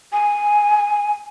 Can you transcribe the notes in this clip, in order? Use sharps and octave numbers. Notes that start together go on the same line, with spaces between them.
G#5